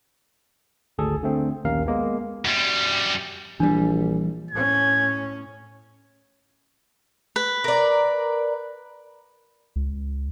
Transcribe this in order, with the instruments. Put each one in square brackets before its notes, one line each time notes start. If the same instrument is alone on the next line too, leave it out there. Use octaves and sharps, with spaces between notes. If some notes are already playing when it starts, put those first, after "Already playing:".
[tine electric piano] G#1 D2 G#4 A4
D3 A3 C4
A#1 D#2 C#4 A#4 F5
G#3 A#3 B3
[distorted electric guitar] F#2 G3
[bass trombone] A#1 [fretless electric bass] E3 G3 [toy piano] D4
[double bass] A2 C#4 [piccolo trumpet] G#6
[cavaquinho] B4
[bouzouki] A#4 D5
[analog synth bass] C#2